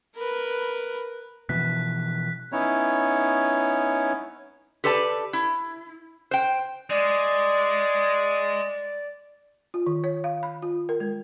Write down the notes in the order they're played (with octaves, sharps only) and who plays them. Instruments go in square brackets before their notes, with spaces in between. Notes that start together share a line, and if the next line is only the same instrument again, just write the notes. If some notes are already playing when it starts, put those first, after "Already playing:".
[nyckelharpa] A#4 B4
[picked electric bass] B2 E3 F3 [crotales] F#6 B6
[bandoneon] B3 C#4 D#4 E4 C#5
[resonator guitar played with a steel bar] G4 A4 B4 D5 A5
E4
C5 G5
[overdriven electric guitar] G#3 [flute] D5
[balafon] F4
D#3
C#5
F5
B5
F4
A#4
G#3